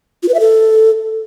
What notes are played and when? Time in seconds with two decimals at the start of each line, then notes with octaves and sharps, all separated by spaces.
0.23 F4
0.29 B4
0.34 E5
0.40 A4